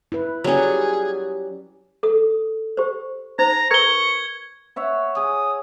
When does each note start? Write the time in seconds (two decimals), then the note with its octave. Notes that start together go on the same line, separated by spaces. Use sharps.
0.12 E4 B4
0.44 F#3 G3 C#4 G#4 F#5
2.03 A4 D#6
2.77 G4 C5
3.39 D#4 C5 A#5
3.71 A#4 B4 C#6 G#6 G7
4.76 C#5 E5 F#5
5.16 G#4 D#6